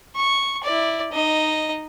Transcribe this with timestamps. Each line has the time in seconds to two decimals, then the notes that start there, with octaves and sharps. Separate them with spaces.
0.16 C#6
0.63 E4 D5
1.12 D#4 D#5